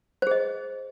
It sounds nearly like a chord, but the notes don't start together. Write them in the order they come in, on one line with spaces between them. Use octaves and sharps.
C5 G#4 D#5